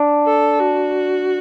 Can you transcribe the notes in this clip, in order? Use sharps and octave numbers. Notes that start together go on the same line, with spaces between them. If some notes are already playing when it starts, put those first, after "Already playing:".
Already playing: D4
A4
F#4